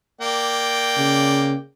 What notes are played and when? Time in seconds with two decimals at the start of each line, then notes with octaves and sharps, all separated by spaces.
0.21 A#3 D5 G5
0.98 C#3